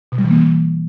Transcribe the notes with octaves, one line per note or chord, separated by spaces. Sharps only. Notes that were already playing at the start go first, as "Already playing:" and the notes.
B2
G3
E3
A#3
E3